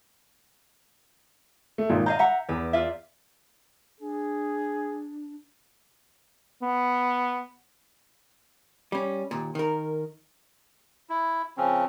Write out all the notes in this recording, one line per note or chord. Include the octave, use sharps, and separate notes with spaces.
A3
G#1 A#2 D#3
D#5 F5 A#5 G6
E5 F#5 A#5
E2 B4
F4 D5 E5
D4 G#4
B3
G3 C#4
D#2 A#2
D#3 A#4
E4
C#3 F3 C4 C#4